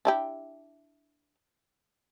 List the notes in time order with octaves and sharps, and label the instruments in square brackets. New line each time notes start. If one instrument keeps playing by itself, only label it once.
[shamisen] D4 E4 G4